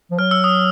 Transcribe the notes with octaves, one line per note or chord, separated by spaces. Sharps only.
F3
F#3 F6
E6
D#6